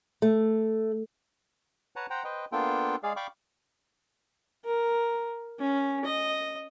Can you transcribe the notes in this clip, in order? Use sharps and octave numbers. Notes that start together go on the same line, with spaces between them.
A3
B4 C#5 F#5 A5 A#5
C5 F#5 G5 A#5
B4 C5 D#5 G5
A#3 B3 D4 F4 A4 G5
G#3 G#4 D5 F5
D5 F5 G5 B5 C#6 D6
A#4
C#4
D#5